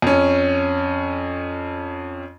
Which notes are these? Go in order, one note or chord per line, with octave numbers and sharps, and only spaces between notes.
F2 C#4